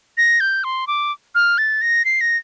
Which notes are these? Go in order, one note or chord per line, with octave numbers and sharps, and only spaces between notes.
A#6
G6
C6
D6
F6
A6
A#6
C7
A#6